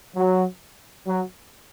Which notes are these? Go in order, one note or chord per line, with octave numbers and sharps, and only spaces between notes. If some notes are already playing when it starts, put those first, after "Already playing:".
F#3
F#3